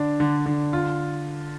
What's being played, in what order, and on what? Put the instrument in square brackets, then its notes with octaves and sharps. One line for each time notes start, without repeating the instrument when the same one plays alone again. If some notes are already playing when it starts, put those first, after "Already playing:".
Already playing: [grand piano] D3 D4
D3
D3
F4